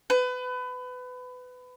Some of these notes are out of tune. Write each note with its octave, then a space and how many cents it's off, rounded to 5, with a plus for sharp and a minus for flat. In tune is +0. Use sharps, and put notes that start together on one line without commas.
B4 +25